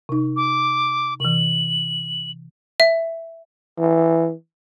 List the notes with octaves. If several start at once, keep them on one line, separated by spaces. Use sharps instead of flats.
C3 D#4
D6
C3 E3 F#7
E5
E3